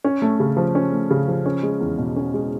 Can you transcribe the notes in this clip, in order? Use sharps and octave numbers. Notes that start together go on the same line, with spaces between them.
C#4
A3
C#3
F3
C#4
A3
C#3
F3
C#4
G#3
E2
B2
C#4
G#3